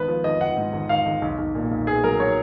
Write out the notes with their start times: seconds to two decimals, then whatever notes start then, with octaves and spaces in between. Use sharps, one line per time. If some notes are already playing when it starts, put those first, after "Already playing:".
Already playing: G#1 B3 B4
0.08 F3
0.24 G#1 D#5
0.41 G#1 F#5
0.57 G#2
0.73 G#1
0.89 G#1 F5
1.06 G#1
1.22 B1
1.38 B1
1.55 A#2
1.71 B1
1.87 B3 G#4
2.04 F#3 A#4
2.20 F#3 C#5